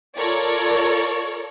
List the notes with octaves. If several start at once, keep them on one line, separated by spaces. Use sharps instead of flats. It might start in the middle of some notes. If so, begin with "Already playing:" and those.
F4 A4 A#4 C#5 D5